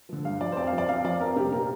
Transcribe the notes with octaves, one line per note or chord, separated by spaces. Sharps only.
D3 F3
G2 F5
F3 D5
C5
F2 D5
F5
F3
D5
F2 F5
F3 D5
F2 A#4
C3 G3 G4
A#2 A#4